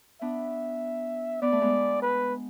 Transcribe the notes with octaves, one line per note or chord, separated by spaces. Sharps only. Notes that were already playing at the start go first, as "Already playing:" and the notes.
B3 D4 E5
B3 D5
A3
G#3 B3
B4